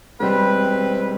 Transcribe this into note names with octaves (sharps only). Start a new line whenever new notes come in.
E1 G3 C4 B4